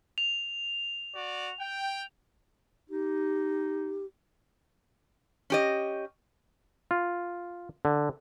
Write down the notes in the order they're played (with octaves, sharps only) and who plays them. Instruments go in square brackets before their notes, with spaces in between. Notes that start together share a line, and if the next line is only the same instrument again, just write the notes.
[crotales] F7
[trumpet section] F#4 D5
G5
[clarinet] D#4 [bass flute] G4
[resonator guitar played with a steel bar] C#4 G4 D#5
[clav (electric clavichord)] F4
D3